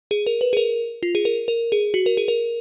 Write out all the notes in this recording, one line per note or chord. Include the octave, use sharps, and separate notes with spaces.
G#4
A#4
B4
G#4
A#4
F4
G#4
A#4
A#4
G#4
F#4
A#4
G#4
A#4